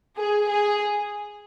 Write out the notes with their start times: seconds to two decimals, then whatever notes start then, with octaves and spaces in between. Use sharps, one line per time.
0.17 G#4
0.48 G#4